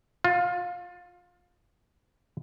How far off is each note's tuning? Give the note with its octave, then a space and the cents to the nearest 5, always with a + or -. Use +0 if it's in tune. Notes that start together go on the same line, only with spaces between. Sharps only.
F4 +25